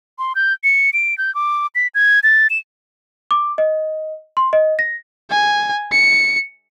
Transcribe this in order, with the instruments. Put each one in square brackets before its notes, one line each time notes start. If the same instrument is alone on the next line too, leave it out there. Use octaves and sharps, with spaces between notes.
[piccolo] C6
G6
C#7
D7
G6
D6
B6
G#6
A6
E7
[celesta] D6
D#5
C6
D#5
A#6
[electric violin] G#5
C#7